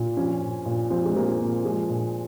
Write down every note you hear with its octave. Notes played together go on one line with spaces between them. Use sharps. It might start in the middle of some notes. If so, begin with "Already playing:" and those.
Already playing: A#2
F3 C#4
A#2
A#2
F3 C4
G#3
F3 A#3
C4
A#2
F3 G#3
A#2